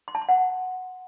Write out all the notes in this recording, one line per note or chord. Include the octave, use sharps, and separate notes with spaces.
C6
A5
C6
F#5